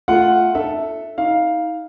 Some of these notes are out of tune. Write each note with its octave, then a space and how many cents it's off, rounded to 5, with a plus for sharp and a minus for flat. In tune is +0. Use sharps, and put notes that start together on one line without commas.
A3 -5 F4 +0 F#5 +0
D#4 -35 A4 +0 E5 +0
D#4 +35 F5 +0